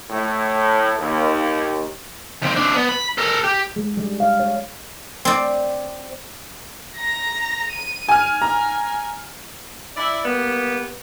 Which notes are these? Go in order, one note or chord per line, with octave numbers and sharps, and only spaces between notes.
A2
D#2
D#2 C4
C4 D4
B3
B5
A4 A#4
G4
G#3
G3
F5
C#5
C4 D5
A#5 A#6
D#7
G#5 F6
G#5 A#5
E4 D5
G3 A#3 B3